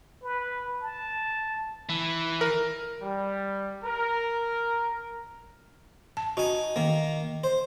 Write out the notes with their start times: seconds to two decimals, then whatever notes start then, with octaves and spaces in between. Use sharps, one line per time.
0.23 B4
0.81 A5
1.89 E3
2.41 A#4
3.02 G3
3.84 A#4
6.17 A5
6.37 D#4 F#4 G#5
6.76 D#3 A#3
7.44 C5